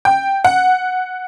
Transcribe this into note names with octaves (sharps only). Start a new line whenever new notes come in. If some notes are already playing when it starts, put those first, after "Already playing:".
G5
F#5